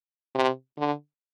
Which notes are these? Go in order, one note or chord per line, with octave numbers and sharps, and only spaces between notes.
C3
D3